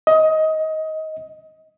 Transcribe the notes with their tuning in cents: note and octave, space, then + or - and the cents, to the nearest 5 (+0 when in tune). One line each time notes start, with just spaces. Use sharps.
D#5 +20